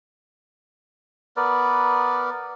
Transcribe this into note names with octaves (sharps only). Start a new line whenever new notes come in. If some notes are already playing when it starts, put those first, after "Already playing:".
B3 A#4 B4 D5